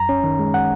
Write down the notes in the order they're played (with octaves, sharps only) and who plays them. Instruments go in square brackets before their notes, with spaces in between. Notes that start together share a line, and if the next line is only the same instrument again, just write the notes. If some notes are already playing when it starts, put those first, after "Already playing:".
Already playing: [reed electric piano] F#2 A#5
C#4
D#3
G#3
F#5